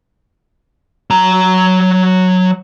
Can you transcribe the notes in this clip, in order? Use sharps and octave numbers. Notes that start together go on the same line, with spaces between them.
F#3 A#5